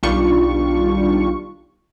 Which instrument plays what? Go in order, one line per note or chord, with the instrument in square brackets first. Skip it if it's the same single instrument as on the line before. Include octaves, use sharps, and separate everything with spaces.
[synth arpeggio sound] B1 D#3 G3 D4 F4 C#6